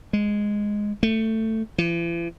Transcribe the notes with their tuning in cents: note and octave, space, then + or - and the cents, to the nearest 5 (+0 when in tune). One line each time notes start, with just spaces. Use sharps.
G#3 -5
A3 +15
E3 +45